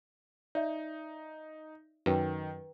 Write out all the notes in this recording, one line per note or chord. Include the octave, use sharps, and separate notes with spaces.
D#4 D5 E5
F#2 D#3 B4 G5